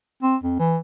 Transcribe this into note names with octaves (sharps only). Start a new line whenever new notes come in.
C4
F2
E3